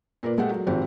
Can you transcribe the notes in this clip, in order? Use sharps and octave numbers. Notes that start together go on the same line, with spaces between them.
A#2 A#4 B4 D5
G#3 A3 G4 A4 F#5
F#3
G#1 F3 C4 G4